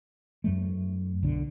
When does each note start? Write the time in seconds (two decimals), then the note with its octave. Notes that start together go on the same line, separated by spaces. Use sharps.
0.44 F#2 F#3 A3
1.23 B1 D3